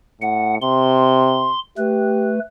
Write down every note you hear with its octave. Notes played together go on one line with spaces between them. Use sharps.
A2 F#5
C3 C6
A3 G4 B4